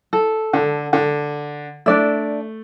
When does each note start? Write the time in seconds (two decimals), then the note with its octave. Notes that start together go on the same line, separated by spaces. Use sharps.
0.13 A4
0.53 D3
0.93 D3
1.86 A3 D4 D5 E5